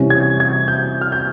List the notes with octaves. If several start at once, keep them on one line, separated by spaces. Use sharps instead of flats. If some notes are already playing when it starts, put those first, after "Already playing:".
Already playing: C3 E3 G3 C#4
G#6
G#6
G6
F6
G6